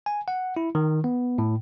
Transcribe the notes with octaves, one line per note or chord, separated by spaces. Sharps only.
G#5
F#5
E4
D#3
B3
A2